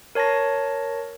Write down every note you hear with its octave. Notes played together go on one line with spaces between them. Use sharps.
A#4 C#5 A5 C#6 A#6